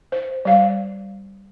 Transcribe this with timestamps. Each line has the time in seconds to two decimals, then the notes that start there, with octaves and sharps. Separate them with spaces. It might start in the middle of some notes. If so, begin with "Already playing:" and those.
0.12 C5
0.45 G3 F5